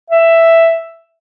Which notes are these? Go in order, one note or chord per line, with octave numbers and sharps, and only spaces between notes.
E5